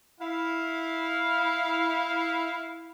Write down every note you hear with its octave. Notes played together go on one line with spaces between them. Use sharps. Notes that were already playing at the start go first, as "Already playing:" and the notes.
E4 F5